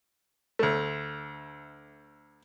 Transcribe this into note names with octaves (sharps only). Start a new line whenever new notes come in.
D2 A3